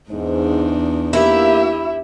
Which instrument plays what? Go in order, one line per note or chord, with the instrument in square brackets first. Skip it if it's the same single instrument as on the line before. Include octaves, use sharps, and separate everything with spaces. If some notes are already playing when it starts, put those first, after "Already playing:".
[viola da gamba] E2 D4 D#4 [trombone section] G#2
[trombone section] A#3 [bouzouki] E4 [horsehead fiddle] G4 E5